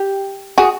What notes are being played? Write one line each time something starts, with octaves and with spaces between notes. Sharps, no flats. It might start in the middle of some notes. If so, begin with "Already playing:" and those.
Already playing: G4
F#4 G#4